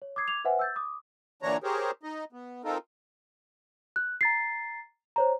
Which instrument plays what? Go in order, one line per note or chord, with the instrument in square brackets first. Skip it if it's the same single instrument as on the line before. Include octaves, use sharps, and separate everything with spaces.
[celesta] C#5
D6 D#6 G#6 C7
D6 G#6 F7
B4 C5 E5 F#5 G#5
E6 G6 A6
D6 D#6
[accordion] A#2 D3 E3 D4 C#5 A#5
G4 G#4 A#4 C5 C#5
D#4 D#5
B3
C4 D#4 F4 A4 A#4
[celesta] F#6
A#5 A6 C7
C5 C#5 A#5